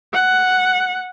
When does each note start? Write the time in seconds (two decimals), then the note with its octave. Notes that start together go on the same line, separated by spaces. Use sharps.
0.14 F#5